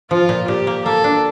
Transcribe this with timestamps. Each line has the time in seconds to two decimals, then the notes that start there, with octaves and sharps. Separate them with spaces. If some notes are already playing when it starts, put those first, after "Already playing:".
0.11 F3 F4
0.29 A#2
0.48 A#2 G4
0.67 A#3
0.85 A#3 A4
1.04 D4